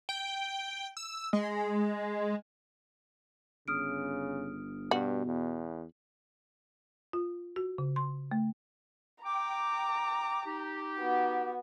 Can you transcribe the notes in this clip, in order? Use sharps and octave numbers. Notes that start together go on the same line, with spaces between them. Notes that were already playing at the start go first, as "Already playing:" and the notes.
G5
E6
G#3
G1 C#3 D#6 F6 D7
G2 B2 F#4
E2
F4
F#4
C#3
C6
A3
G5 A#5 D6
D#4 G4
B3 F#4